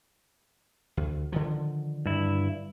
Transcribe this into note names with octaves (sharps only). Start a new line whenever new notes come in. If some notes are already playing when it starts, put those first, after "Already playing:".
D2
D3 D#3 F3
G2 E4